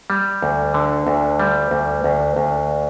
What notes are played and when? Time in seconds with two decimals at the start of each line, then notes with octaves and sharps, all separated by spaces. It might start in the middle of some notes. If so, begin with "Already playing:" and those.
0.10 G3
0.42 D2
0.74 D3
1.07 D2
1.40 G3
1.71 D2
2.04 D2
2.36 D2